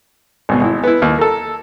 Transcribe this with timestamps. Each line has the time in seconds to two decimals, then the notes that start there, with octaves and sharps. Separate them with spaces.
0.49 G#1 B2
0.61 G#1 E4
0.84 B3 E4
1.02 D#2
1.19 A4 A#4